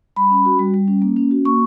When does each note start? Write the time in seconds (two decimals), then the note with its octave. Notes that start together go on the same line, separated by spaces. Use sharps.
0.16 G3 B5
0.30 C#4
0.45 F#4
0.59 G3
0.74 G3
0.88 C#4
1.02 A#3
1.16 C#4
1.31 F#4
1.45 A#3 C#6